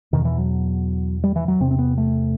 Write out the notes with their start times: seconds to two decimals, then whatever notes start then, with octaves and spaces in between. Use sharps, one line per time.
0.13 E2 B2 D#3
0.25 E3
0.38 F#3
1.24 G3
1.36 E3
1.48 F#3
1.60 E2 C3 C4
1.71 C4
1.79 B3
1.98 A3